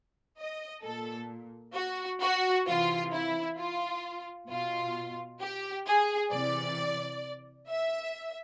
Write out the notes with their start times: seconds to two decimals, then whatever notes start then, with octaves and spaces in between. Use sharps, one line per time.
0.39 D#5
0.83 A#2 A4
1.75 F#4
2.21 F#4
2.66 C3 E3 F4
3.12 E4
3.58 F4
4.49 B2 F4
5.41 G4
5.86 G#4
6.32 C3 E3 D5
7.69 E5